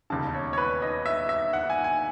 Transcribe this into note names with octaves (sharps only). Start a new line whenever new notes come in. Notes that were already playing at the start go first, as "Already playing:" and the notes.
E1 D#2 C#3 A5
C#5
C#5
B4
D#5
E5
E5
F#5
G#5
G#5